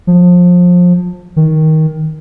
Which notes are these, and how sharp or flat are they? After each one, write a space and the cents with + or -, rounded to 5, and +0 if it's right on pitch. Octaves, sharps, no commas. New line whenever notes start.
F3 +25
D#3 +15